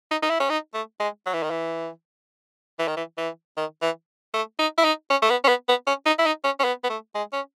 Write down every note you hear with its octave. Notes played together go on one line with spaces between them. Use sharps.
D#4
D#4
E4
C#4
D#4
A3
G#3
F#3
E3
D#3
E3
E3
D#3
E3
E3
D#3
E3
A3
D#4
E4
D#4
C#4
A3
B3
C#4
B3
B3
C#4
D#4
E4
D#4
C#4
C#4
B3
B3
A3
G#3
C#4